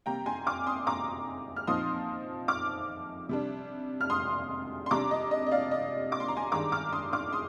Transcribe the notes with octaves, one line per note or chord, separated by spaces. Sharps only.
C3 G3 A#3 G5 A#5
G#5 C6
D6 F6
C6 D#6
A#5 D6
F6
A#2 F3 C4 D#4 C6 D#6
D6 F6
C3 G3 D4
F6
C6 D#6
C6
C3 G3 D4 A#5 D6
D#5
D#5
D#5
D5 F5
D#5
D6
C6
A#5
G#5 C6
G2 D#3 G#3 D4 A#5 D6
D6 F6
C6 D#6
D6 F6
C6 D#6